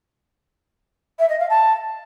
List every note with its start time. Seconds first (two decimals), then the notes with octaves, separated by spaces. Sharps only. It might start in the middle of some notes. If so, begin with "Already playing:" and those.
1.19 E5
1.29 D#5
1.40 F5
1.50 A5